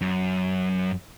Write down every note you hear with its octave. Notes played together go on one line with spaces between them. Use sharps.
F#2